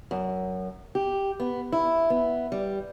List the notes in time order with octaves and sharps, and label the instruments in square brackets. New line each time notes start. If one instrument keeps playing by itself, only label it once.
[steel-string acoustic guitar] F#2
G4
B3
E4
B3
G3